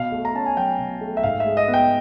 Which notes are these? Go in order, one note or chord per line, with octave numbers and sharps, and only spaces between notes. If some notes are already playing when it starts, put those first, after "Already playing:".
Already playing: B2 F5
A3
A#5
C#4 A5
G#5
F#3 G5
B2
A3
E5
G#2 F5
E5
G#3
D#5
B3
G5